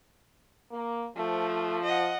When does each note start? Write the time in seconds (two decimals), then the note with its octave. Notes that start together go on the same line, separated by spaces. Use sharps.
0.71 A#3
1.16 F3 A3
1.85 D#5 F#5